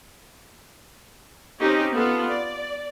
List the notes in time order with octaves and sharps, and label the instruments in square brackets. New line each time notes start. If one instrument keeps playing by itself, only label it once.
[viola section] C4 C#4 D#4 G4
B3 F4 A4
D5